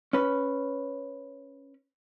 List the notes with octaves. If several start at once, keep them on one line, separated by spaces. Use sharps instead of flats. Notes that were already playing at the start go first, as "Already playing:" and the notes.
C#4 B4